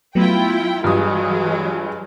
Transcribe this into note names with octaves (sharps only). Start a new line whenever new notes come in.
F#3 A3 B3 E4 F4 G5
G2 E3 F#3 G#3 F4 D#6